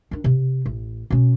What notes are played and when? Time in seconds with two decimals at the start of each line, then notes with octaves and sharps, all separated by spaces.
0.11 D#3 D4
0.24 C3
0.66 A1
1.10 B2 C#4